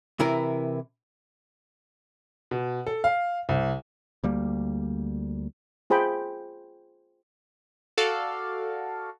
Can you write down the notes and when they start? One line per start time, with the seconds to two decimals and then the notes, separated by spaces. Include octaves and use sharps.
0.20 C3 E3 E4 A#4
2.51 B2
2.87 A4
3.04 F5
3.49 C2
4.24 D2 G3 A#3
5.90 F4 G#4 C5 G5 B5
7.97 F#4 A4 D5 F5